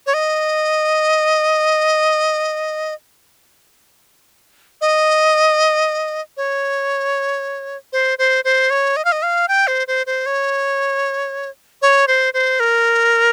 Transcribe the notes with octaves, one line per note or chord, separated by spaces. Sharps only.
C#5
D#5
D#5
C#5
C5
C5
C5
C#5
D#5
F5
D#5
F5
G5
C5
C5
C5
C#5
C#5
C5
C5
A#4